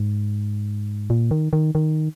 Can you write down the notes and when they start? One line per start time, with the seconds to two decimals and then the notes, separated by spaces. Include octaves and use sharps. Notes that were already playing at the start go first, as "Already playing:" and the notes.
Already playing: G#2
1.10 A#2
1.31 D#3
1.53 D#3
1.75 D#3